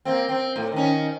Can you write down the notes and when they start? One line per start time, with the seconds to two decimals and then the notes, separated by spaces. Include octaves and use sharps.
0.05 A#3 C4
0.29 C4
0.56 A2
0.72 D#3 C#4